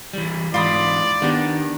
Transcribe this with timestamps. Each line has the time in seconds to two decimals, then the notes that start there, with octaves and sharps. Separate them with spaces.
0.13 E3 G3
0.54 G#2 E3 F4 D5 B5 D#6
1.22 D#3 B3 D4 G4